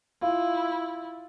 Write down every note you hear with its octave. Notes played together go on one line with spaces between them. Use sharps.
E4 F4